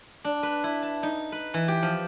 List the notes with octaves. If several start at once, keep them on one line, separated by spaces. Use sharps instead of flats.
D4
B4
E4
A5
D#4
B4
E3
G4
F3